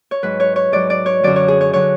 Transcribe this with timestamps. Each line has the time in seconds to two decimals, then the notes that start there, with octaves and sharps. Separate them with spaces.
0.11 C#5
0.22 G#2 F#3 B4
0.40 C#5
0.56 C#5
0.72 G#2 F#3 D5
0.90 D5
1.06 C#5
1.23 F#2 D3 F#3 D5
1.36 C#5
1.48 G#4
1.61 C#5
1.73 D3 F#3 C#5